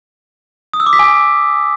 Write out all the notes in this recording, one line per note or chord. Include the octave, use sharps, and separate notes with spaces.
D#6
E6
D6
B6
G#5